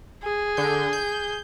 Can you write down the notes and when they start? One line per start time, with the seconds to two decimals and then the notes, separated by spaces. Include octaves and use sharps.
0.23 G#4
0.57 D3 G6
0.93 G6